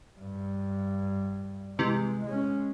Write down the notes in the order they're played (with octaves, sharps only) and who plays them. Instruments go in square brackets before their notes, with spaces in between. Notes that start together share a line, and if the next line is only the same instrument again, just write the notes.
[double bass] G2
[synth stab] C3 E3 [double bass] G#3
[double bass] G#3 C#4